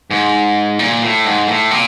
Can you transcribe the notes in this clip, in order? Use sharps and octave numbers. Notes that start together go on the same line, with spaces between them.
G#2
A#2
A2
G#2
A2
A#2